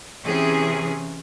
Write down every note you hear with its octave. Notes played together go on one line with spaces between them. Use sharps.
C3 E3 C#4 G#4